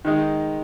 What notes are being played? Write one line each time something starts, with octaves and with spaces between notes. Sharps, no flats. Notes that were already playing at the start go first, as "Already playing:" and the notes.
D#3 G#3 D#4